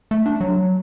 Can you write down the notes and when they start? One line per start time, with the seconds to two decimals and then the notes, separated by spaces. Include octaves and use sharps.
0.11 A3
0.26 D4
0.41 F#3